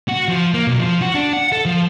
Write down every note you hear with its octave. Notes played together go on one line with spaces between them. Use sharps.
F#4
F3
A#3
B1
F3
F#4
D4
F#5
A4
F3